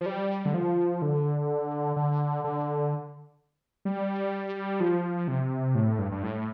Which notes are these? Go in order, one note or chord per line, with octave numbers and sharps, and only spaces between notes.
F3
G3
D3
F3
D3
D3
D3
G3
F3
C3
A2
G2
G2
A2